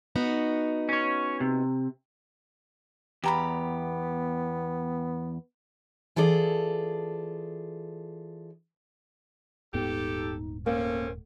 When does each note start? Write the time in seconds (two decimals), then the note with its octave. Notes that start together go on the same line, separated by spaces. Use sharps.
0.15 B3 D#4 F#4
0.89 C#4 C#5
1.40 C3
3.24 E2 B3 G4 A#5 B5
6.16 E3 F4 G#4 A4 D5
9.74 D#1 G#2 B3 D#4 G4 A4
10.66 A3 A#3 C4 C#4 A#4